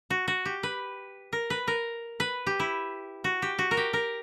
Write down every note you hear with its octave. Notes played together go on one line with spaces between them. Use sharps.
F#4
F#4
G4
B4
A#4
B4
A#4
B4
G4
E4
F#4
G4
F#4
A#4
G4
A#4